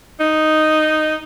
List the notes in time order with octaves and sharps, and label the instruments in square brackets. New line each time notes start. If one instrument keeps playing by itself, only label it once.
[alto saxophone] D#4